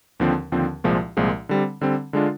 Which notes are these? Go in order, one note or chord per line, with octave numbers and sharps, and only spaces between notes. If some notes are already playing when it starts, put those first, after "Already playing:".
D#2 D3 F3 C4
D#2 D3 F3 C4
C2 A#2 F3 G#3
C2 A#2 F3 G#3
D3 G3 C4
D3 G3 C4
D3 G#3 D4 F4